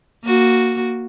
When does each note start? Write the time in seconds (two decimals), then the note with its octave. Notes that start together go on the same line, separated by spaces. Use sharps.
0.24 A#3 F#4